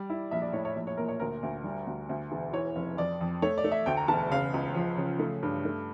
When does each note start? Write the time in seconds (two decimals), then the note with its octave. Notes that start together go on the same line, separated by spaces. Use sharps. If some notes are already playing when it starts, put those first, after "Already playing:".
Already playing: G3 D5
0.10 E4
0.31 A#1 E5
0.42 D5
0.53 A2 C#5
0.65 C#5
0.75 A#1
0.87 C#5
0.97 A#2 A#4
1.08 C#5
1.20 D2 A#4
1.43 D2
1.64 G3
1.87 D2
2.09 D2
2.32 E1
2.53 E3 C#5
2.76 F1
2.97 F2 D5
3.21 F2
3.42 A3 C#5
3.58 D5
3.64 A3
3.71 E5
3.86 D2 G5
3.97 A#5
4.08 E1 A5
4.31 C#3 F5
4.54 C#2
4.75 F3
4.97 C#3
5.19 A3
5.43 G2
5.65 A3